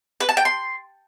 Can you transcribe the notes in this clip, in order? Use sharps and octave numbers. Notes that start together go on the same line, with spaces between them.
B4
A5
G5
C6